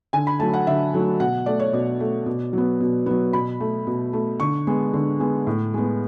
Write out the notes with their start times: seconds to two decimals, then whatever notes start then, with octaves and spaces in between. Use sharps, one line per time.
0.13 D3 G#5
0.27 B5
0.40 F#3 A3 A5
0.54 F#5
0.67 D3 E5
0.93 F#3 A3
1.20 B2 F#5
1.46 A3 D5
1.60 C#5
1.73 B2 D5
2.00 A3
2.26 B2
2.53 F#3 B3
2.80 B2
3.06 F#3 B3
3.33 B2 B5
3.60 A3
3.87 B2
4.13 A3
4.40 D3 C#6
4.67 G#3 B3
4.94 D3
5.20 G#3 B3
5.47 A2
5.74 G#3 B3